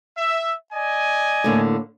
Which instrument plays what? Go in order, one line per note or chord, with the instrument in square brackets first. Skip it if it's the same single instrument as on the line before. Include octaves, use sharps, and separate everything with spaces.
[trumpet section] E5
D5 D#5 G#5
[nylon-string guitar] A2 D3 A#3